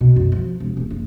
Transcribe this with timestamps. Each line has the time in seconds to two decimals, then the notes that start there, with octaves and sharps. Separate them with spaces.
0.01 B2
0.16 F#2
0.32 F3
0.60 E1
0.77 D#1
0.90 F#1